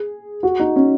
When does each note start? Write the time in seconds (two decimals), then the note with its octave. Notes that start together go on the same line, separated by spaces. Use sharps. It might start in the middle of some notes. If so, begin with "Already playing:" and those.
Already playing: G#4
0.43 F#4
0.60 D#4
0.76 C#4